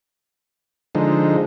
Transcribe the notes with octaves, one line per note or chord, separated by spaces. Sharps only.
D3 F3 G#3 D#4